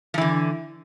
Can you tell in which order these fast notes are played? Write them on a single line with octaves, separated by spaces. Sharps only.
F3 E3 D3